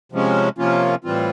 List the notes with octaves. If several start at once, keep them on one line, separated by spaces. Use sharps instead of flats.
C3 F3 G#3 C#4
C3 F3 A#3 C#4 F4
A2 E3 G3 C4 F4